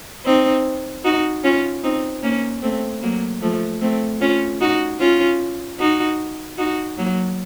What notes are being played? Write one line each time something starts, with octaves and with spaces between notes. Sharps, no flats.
C4 D#4
D#4 F#4
C#4 F4
C4 D#4
A#3 C#4
A3 C4
F#3 A#3
F3 A3
A3 C4
C#4 F4
D#4 F#4
C#4 F4
D#4 F#4
D#4 F#4
F#3 A#3